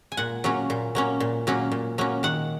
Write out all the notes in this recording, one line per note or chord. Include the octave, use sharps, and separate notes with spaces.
G#5
A#2 F#5
F#3 A#3 C#4
A#2
F#3 A#3 C#4
A#2
F#3 A#3 C#4
A#2
F#3 A#3 C#4
D#3 F#5